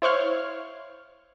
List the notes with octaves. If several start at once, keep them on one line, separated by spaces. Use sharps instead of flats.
E4 C5 C#5 F5